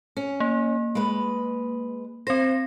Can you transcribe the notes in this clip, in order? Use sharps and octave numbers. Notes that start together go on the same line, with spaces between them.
C#4
A#3
G#3 B4
C4 C5 A#6